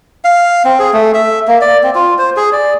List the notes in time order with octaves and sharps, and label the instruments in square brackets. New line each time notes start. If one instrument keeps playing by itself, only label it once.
[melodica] F5
C4
G#4
A3
E5
A#3
D5
C4
F4
C5
G#4
D5